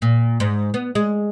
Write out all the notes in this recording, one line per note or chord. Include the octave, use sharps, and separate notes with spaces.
A#2
G#2
B3
G#3